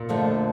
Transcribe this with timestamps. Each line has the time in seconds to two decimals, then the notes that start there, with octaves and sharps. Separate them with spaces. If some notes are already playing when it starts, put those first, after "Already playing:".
Already playing: A#2
0.09 F2 D3 F3 A3 D4